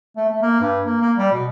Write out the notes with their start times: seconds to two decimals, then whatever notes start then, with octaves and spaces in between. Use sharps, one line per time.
0.17 A3
0.29 A3
0.42 A#3
0.61 G2
0.85 A#3
1.01 A#3
1.17 G3
1.32 B2